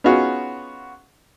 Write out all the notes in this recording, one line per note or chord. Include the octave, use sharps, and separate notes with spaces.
B3 C#4 D#4 F4 F#4 G#4